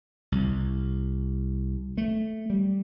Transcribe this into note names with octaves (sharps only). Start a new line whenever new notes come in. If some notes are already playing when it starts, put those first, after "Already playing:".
C2
A3
G3